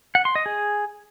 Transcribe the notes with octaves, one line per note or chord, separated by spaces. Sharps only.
F#5
C6
D#5
G#4